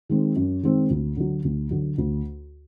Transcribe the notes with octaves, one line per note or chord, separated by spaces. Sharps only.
D#3 G#3 C4
F#2
D#3 G#3 C4
D2
D3 F#3
D2
D3 F#3
D2